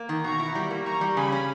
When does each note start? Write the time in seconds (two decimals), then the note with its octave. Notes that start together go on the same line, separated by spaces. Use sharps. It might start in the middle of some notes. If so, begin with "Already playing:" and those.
Already playing: A#3
0.09 D#3
0.24 B2 A#5 C#6
0.40 E4
0.55 G3
0.70 A#3
0.86 G3 A#5 C#6
1.01 G3
1.17 C#3 G#5 B5
1.32 C#4